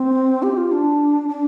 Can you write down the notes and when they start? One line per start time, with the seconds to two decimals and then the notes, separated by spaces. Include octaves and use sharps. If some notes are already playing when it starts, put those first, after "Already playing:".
Already playing: C4
0.43 G4
0.57 F4
0.72 D4
1.29 D4